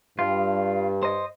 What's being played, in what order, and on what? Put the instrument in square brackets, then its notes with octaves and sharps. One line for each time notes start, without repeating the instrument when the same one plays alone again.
[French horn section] G2 [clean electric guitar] F4
[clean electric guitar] C5 D#5